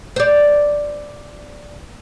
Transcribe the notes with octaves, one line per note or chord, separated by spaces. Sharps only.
C5 D5